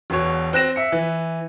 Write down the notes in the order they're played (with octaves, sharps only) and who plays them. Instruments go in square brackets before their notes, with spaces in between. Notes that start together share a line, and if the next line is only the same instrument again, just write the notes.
[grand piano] E1 B2 C#5
C4 F#6 A#6 E7
E5 C#7
E3